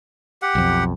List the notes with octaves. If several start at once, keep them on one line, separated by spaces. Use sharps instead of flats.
G4 F#5
B1 F2